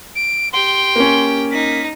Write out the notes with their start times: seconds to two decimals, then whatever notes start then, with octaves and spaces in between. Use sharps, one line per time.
0.15 D7
0.52 G4 G5 C6
0.96 A#3 C#4
1.51 D#4 B6